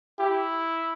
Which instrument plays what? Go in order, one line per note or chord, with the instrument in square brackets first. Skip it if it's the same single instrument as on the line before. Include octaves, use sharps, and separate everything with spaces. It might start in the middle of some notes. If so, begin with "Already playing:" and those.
[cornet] E4 [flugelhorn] G4